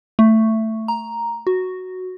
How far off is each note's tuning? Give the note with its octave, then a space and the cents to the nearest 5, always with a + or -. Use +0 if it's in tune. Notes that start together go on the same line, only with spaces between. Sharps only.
A3 +10
A#5 +5
F#4 +0